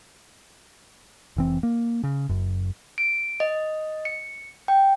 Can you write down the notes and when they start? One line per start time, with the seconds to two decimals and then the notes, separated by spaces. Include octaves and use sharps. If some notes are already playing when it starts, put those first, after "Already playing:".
1.37 F1 E3 C4
1.63 A#3
2.04 C#3
2.29 F#1 F#2
2.98 D7
3.40 D#5
4.05 C#7
4.68 G5